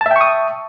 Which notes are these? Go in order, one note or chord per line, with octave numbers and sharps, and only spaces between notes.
E5 G5 A5 C#6 D#6